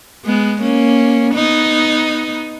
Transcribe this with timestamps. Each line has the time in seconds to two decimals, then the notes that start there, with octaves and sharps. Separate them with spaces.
0.25 G#3 B3
0.61 A#3 C#4
1.34 B3 D#4